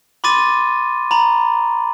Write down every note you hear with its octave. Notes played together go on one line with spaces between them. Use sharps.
B5 C6 D6 A6 D#7
A#5 B5